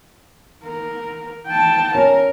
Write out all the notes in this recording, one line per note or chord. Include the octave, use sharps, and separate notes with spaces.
A#4
G5 A5
C#4 A#4